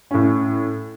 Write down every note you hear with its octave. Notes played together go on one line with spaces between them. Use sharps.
A2 C#4